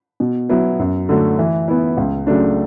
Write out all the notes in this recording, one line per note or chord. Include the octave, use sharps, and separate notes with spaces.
B2
F#3 B3 E4
F#2
D3 F#3 A3
E3
B3 E4
C#2
C#3 F#3 A3 D4